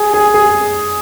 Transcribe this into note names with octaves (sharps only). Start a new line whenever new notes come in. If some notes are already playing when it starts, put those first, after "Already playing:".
Already playing: G#4
G#4
G#4